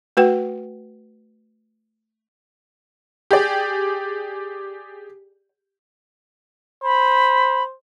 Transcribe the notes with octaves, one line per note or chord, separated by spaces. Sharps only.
A3 F#4 B4 F#5 G5
G4 G#4 D5
C5 B5